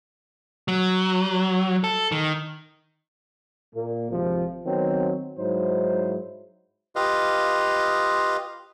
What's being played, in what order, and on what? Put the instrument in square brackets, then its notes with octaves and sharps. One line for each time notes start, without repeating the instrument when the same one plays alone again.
[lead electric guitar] F#3
A4
D#3
[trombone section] A#2 A#3
G#1 F2 C3 F3
D#3 F#3 B3 C4
G#2 F#3 D#4 E4 C5
[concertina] F4 G4 B4 D#5 F5